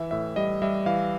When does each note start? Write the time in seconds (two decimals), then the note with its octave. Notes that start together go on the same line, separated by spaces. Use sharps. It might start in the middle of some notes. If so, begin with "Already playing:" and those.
Already playing: E3 E5
0.11 A2 E5
0.36 G3 D#5
0.62 G3 E5
0.86 E3 F5